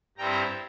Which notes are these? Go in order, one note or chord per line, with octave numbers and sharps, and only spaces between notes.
G2 G3 C4 E4 G5 A#5